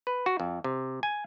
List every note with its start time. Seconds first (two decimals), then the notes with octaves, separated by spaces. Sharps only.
0.07 B4
0.26 F#4
0.40 F2
0.64 C3
1.03 G#5